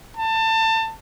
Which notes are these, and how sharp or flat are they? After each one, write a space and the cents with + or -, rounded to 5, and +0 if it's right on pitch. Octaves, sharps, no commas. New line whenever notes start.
A5 +25